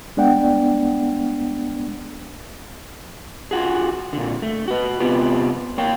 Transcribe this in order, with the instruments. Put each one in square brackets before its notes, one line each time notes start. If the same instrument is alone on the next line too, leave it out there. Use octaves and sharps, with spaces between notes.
[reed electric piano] G#3 B3 D4 D5 F#5 G5
[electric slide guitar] F4 F#4 G#4
A#2 D3
A3
F#4 B4
C3 B3 C4 F4 G4
A#3 C#5 F5 G5